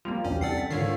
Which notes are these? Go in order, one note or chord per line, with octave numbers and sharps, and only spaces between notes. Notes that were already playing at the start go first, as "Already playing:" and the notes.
F3 G3 A#3 F7
B1 E2 G2 C#4 G5
C2 A4 D5 F#5 A6 C7
B6
G#2 D3 D#3 D4 F4 A4 C#5 C7